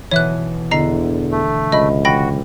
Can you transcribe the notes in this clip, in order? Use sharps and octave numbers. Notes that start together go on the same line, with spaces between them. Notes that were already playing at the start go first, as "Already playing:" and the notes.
B2 E3 C#5 E5 F#6
E2 D3 D#5 A#5 C7
A3
C#2 D#5 E5 B5
E3 F#4 G5 B5 A#6